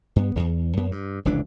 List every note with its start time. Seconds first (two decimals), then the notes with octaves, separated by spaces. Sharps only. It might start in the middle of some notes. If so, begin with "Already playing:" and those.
0.16 G2 B3
0.35 D#1 E2
0.77 F#2 B3
0.92 G2
1.25 F1 C#2 E3 D4